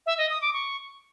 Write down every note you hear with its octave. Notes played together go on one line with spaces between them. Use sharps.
E5
D#5
D#6
D6
C#6